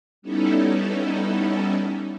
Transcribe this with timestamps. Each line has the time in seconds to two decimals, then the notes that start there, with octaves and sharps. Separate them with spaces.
0.22 G3 B3 C#4 D#4 E4 A4